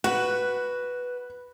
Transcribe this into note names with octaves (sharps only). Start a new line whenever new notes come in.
F#4 B4